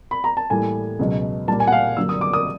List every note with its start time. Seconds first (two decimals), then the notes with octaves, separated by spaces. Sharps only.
0.11 B5
0.24 A#5
0.37 A5
0.50 A2 E3 G3 A#3 G#5
0.99 C#2 B2 F#3
1.48 A#2 G3 A#3 A5
1.60 G#5
1.67 F#5
1.72 F5
1.97 G2 D3 F#3 A#3 E6
2.09 D#6
2.21 D6
2.33 D#6